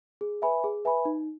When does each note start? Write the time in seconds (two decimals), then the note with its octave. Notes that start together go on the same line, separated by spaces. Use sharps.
0.21 G#4
0.42 B4 E5 G#5 B5
0.64 G#4
0.85 B4 E5 G#5 B5
1.05 D#4